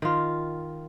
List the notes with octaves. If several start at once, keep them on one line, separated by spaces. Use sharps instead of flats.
D#3 F4